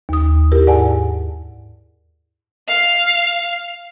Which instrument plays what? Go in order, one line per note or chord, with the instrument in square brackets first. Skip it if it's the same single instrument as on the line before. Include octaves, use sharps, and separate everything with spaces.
[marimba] D#2 D#6
E4 G4 A#4
G#2 D5 F#5 G#5 A5
[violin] F5